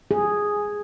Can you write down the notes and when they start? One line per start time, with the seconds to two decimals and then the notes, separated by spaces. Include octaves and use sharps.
0.11 G#4